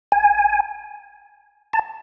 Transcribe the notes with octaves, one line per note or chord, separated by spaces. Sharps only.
G#5
A5